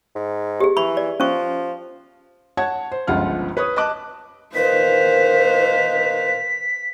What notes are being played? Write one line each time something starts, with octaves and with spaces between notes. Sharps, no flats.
G#2
G4 G#4
E3 B5 C#6
D5
F3 C#4 C#6
C#5 F#5 A5 G#6
C5
G1 C#2 F3 F4 F#5 F6
B4 C#5 D#6
D#5 A5 D6 F#6
A#2 D#3 B4 C5 F5 B6